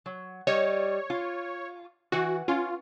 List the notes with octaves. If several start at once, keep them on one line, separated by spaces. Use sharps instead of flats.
F#3
G3 C#5 D#5
F4
E3 F#4 B4 F#5
C#4 F4